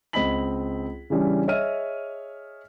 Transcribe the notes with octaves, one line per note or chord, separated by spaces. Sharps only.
C#2 C4 D#5 B5 B6 F#7
C#3 E3 G3 C#4 D4
G#4 C#5 D#5 E5 F6 D#7